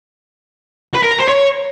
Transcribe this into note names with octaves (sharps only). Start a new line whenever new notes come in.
B4
A#4
A#5
C5
C#5